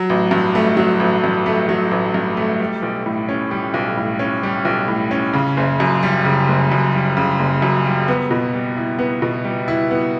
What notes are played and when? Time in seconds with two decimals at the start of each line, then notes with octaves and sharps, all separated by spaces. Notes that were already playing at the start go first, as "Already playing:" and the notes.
Already playing: F#3
0.10 A1
0.31 G2
0.55 A3
0.77 F#3
1.00 A1
1.24 G2
1.46 A3
1.69 F#3
1.91 A1
2.14 G2
2.37 A3
2.60 G3
2.82 B1
3.06 A2
3.29 C#4
3.51 G3
3.74 B1
3.97 A2
4.19 C#4
4.43 G3
4.65 B1
4.88 A2
5.11 C#4
5.33 C#3
5.57 F#1
5.80 F#2
6.03 G3
6.25 C#3
6.49 F#1
6.72 F#2
6.94 G3
7.17 C#3
7.39 F#1
7.62 F#2
7.86 G3
8.08 B3
8.31 B2
8.54 G3
8.77 E4
8.99 B3
9.22 B2
9.45 G3
9.68 E4
9.91 B3